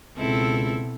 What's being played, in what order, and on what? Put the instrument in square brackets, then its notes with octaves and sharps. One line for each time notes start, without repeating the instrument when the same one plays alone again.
[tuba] C#2 [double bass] B2 [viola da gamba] C4 E4 A4